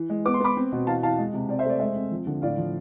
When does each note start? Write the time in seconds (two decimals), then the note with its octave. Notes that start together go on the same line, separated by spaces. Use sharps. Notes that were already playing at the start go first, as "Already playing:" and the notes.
Already playing: E3
0.10 G#3
0.25 B3 D6
0.34 C6
0.40 B3 B5 D6
0.57 C4
0.72 B2
0.87 E3 F5 A5
1.03 E3 F5 A5
1.19 G#3
1.34 C3
1.49 C4 D5
1.59 C5 E5
1.65 A3 D5
1.80 G#3 C5 E5
1.96 C4
2.12 F3
2.27 D3
2.42 A2 D5 F5
2.58 F3